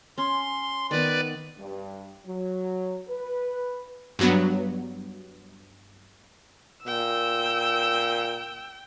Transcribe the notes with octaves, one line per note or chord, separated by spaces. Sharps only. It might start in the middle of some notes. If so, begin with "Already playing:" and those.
C#4 C6
D#3 B3 B4 D5
G2
F#3
B4
G2 F#3 B3
A#2 G5 E6